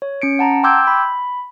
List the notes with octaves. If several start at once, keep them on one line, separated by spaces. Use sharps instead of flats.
C#5
C#4 C#7 D7
F#5 A5 A#5
G5 C6 D6 E6 G6 G#6
B5